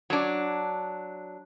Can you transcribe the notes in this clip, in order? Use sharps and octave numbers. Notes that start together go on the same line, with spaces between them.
F#3 D4